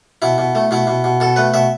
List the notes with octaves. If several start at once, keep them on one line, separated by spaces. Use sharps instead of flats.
B2 E4
B2
A3
B2 E4
B2
B2
B2 A4
A3 B4
B2 E5